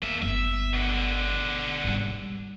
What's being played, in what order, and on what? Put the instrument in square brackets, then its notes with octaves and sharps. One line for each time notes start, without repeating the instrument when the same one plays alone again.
[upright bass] E2 [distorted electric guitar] A#3 E5
[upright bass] G1 B3 [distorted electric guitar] E5
[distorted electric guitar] B2 D3
[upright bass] G#2 G3